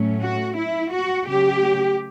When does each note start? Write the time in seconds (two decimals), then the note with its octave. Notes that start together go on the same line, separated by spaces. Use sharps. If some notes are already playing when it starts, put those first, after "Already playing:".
Already playing: A2 F#3 A3 C#4
0.21 F#4
0.56 E4
0.92 F#4
1.28 C#3 F#3 A3 G4